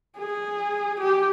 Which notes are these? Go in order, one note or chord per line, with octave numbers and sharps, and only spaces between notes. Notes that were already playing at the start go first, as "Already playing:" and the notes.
G#4
G4